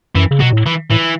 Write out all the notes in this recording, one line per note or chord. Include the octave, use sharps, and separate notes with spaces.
F#2 E3
C#3
B2 F#3
A2
E3
A2 E3